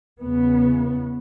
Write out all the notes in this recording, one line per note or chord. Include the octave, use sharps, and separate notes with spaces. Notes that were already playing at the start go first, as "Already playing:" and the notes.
E2 C#3 B3